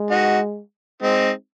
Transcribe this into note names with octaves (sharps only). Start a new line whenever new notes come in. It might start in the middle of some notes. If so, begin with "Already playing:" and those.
Already playing: G#3
D#4 F#4
G#3 C4 D#4